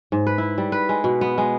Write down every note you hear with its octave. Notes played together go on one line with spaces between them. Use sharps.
G#2
B4
E4
G3
B4
G#3
B2
B3
G#3